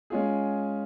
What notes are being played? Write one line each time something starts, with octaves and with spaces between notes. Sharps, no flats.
G#3 C#4 F4 G#4